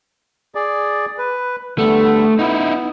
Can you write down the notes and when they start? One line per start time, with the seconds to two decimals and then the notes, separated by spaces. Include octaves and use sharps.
0.55 G#4 D5
1.18 B4
1.78 D3 G3 A3 B3
2.39 B3 D#4 E4